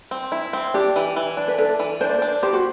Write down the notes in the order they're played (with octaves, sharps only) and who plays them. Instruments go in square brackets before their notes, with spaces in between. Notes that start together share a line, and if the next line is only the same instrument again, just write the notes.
[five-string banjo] C4
E4
C4
[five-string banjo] D4 [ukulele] G4
[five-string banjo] E3
E3
D4
[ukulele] B4
[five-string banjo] D4 [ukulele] A4
[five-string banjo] E3
[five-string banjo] D4 [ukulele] C5
[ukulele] D5
C5
[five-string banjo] D4
[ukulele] G4 [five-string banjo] C5
[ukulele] F#4